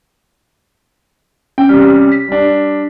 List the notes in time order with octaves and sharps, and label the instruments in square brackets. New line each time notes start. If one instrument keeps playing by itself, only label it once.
[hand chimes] C#4 [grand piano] G5
[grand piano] C3 G3 [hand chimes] C#4 F6
[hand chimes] B6
[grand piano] G3 D4